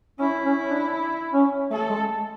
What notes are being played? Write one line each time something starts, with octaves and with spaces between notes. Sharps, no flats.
C#4 E4
C#4
D4
C#4
A3 A4
G#3